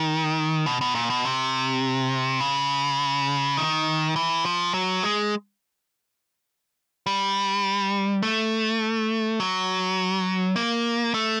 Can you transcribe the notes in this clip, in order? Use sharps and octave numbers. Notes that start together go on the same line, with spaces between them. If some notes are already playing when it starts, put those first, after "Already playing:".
Already playing: D#3
B2
B2
A#2
B2
C3
C#3
D#3
E3
F3
F#3
G#3
G3
A3
F#3
A#3
A3